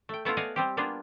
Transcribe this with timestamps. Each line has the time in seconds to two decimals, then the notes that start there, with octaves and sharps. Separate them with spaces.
0.09 A3 G5
0.25 A3 B3 E4 F4
0.37 B3 D5 D#5 F5 F#5 G#5
0.56 G3 C4 G4
0.77 G3 A#3 B3 D4 F4 G#4